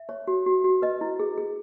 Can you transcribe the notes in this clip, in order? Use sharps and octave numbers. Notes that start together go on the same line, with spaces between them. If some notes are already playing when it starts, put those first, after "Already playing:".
Already playing: E5
C#5
F#4
F#4
F#4
B4 D#5
E4
G#4
G#4